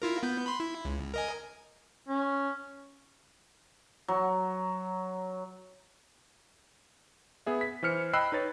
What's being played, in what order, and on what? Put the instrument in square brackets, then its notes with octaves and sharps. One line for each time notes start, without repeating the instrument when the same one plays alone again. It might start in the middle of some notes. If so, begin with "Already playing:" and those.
[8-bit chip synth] E4 F4 A#4
B3 G6
B5 C6
E4
C#2
A#4 D#5 G#5
[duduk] C#4
[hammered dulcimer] F#3
[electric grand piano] B3 G#4 E5
B6
E3 C5 F6 C#7
D#5 G5 B5 E6 F#6 C7
D#4 B4 C#5 A6